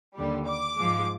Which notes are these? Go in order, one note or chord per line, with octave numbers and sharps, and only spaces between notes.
D#2 D3 G3
D6
G#2 F3 G#3